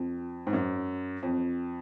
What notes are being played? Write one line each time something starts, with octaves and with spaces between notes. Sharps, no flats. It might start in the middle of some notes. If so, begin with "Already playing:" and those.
Already playing: F2
G#2
F#2
F2